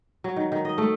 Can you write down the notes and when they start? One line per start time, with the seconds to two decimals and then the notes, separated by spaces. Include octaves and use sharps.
0.24 F#3
0.36 D#3
0.52 D#3
0.65 D#5
0.78 A3